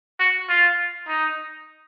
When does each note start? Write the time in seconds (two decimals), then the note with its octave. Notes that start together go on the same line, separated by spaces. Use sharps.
0.19 F#4
0.49 F4
1.08 D#4